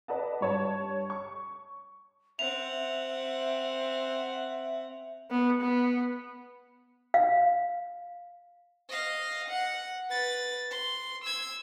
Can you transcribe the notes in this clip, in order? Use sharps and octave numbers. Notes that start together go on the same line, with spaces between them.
B4 D5 D#5 F#5 A5
G2 C#5 A5
C#6
C4 E5 F#5 F7
B3
B3
F5
D#5 F5
F#5
B4 A6
C6
E6 G#6